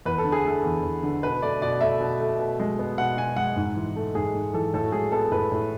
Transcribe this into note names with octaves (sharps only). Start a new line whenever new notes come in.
E2 B4
A4
D3
G#4
A3 A4
E2
E2
D3
B2 B4
A3 D5
B2 D5
A3 E5
B2
A3
B2
G#3
B3
B2 F#5
B2 G#5
G#3 F#5
G#2
E3
A3
G#2 G#4
G#2
E3 A4
A2 A4
F#4
G#3 G#4
B3 A4
A2 B4
A2